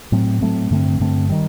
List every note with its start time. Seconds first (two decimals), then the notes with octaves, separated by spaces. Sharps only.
0.12 A2 F#3 A3 C4
0.41 A2 F#3 A3 C4
0.71 G2 D3 A3 C4
1.00 G2 D3 A3 C4
1.29 D#3 G3